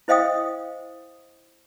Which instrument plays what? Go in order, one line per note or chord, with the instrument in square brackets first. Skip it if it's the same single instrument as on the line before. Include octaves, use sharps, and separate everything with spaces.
[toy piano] E4 C5 D#5 F5 G5 D#6